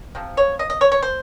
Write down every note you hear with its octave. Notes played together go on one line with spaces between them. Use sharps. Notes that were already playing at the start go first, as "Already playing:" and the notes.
C3 F3
C#5
D#5
D#5
C#5
C#5
C5